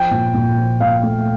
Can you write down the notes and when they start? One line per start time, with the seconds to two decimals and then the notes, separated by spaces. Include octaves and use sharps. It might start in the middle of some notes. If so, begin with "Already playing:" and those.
Already playing: F3 G5
0.11 A#2
0.34 A#2
0.58 F3
0.81 A#2 F5
1.03 A3